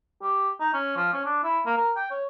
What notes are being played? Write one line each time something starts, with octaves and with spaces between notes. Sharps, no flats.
G4
D#4
C#4
F3
C#4
D4
E4
A#3
A#4
G5
C#5